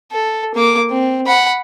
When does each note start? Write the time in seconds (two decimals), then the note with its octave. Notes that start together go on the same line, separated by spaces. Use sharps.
0.12 A4
0.55 A#3 D6
0.90 C4
1.27 F#5 B5